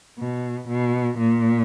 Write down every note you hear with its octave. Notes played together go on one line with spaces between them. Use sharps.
B2
B2
A#2